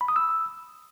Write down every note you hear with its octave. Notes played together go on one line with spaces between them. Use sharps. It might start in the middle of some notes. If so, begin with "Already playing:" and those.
B5
D#6
E6